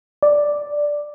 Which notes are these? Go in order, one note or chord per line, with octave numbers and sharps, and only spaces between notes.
D5